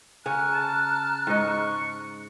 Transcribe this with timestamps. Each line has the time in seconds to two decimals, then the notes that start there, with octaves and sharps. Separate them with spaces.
0.26 C#3 C#4 A#5 F6 F#6
0.52 A5
1.27 G#2 D#5 C#6